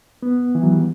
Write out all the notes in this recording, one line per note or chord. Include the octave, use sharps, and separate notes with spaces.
B3
E3
F#3
G3